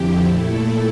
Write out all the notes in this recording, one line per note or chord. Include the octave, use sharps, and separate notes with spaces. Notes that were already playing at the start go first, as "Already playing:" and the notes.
Already playing: F2 D3 F3 C4 E4 G4
A#2 A3 E4 A4